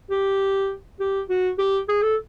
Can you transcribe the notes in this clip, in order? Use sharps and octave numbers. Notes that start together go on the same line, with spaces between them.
G4
G4
F#4
G4
G#4
A4